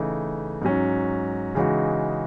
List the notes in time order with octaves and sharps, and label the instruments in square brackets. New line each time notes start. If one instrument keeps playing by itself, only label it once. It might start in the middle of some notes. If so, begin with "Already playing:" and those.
Already playing: [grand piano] C#3 E3 A3 D#4
G#2 F#3 C#4
C#3 E3 G#3 D#4 F#4